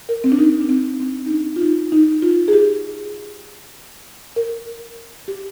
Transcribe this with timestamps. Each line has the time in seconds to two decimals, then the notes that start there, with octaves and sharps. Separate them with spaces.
0.09 A#4
0.24 C4
0.32 D4
0.38 D#4
0.61 D4
0.69 C4
1.00 C4
1.26 D#4
1.31 D4
1.56 F4
1.62 D#4
1.92 D#4
2.22 F4
2.48 G#4
2.53 G4
4.36 A#4
5.28 G4